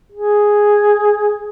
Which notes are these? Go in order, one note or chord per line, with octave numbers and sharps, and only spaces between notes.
G#4